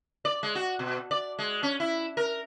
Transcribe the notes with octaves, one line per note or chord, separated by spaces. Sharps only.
D5
G#3
F#4
B2
D5
G#3
C#4
E4
A#4